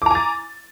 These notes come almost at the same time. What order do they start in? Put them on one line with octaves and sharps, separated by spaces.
D6 A#5 G#5 A6